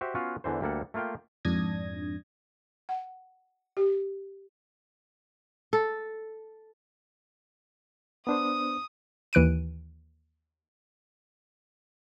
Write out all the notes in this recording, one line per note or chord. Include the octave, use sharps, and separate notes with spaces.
F#4 G4 C5 E5
B3 C#4 F4 F#4 C#5 F5
E2 D3 E3 C5
D2 G3 A#3 A4 F#5
A3 A#3 F4 F5 G5
F2 G#2 D4 D#6 G#6 A#6
F#5
G4
A4
B3 D4 C5 D#6
D#2 E3 F#6 D7 D#7